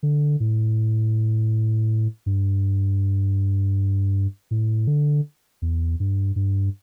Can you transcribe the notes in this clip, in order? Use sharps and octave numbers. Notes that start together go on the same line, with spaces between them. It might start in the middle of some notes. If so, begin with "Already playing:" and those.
D3
A2
G2
A2
D3
E2
G2
G2